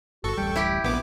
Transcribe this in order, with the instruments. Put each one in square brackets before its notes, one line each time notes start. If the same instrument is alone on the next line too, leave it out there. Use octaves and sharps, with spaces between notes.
[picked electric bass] G1 [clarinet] F#4 [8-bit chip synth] A4 C#6
[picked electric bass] D1 A1 G3 [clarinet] G5
[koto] E4 G4
[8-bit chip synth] A#1 B3 D6